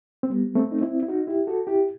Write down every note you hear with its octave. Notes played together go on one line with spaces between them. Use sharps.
C4
G3 B3
A3 C4
D#4
C4 E4
E4
D#4 F#4
E4 G4
F#4 A4
E4 G4